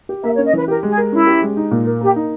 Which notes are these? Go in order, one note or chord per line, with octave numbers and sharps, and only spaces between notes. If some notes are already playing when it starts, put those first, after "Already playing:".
G4
A#3 E5
C#5
C#4
D#5
E3 B4
G4 A#4
G#3
G#4
A#4
C#4 E4
G4
G#3
D#4
A#2
A#4
A#3 G4
D#4